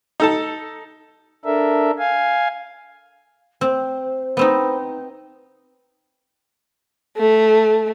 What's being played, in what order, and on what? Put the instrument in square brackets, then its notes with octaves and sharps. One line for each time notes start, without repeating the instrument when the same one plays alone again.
[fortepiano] D#4 A4 A5
[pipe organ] D4 A4 A#4 E5
F5 G#5
[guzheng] C4 [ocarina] C5
[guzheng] B3 C4 D#4
[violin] A3